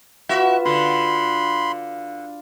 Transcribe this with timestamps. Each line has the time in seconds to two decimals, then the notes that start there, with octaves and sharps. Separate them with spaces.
0.29 F4 F#4 B4 E5
0.65 D3 F4 B5 C6